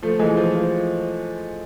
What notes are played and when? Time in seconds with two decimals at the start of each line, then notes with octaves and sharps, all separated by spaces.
0.03 F3 A3
0.19 E3 G#3
0.37 F3
0.55 F3